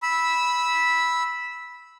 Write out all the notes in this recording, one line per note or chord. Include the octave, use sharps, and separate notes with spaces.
B5 E6